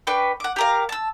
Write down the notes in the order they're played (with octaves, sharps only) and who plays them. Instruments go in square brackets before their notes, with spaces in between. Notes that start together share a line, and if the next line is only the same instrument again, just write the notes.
[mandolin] D4 B4 G5 C#6
F#5 D6
G4 A#4 F5
A5 E6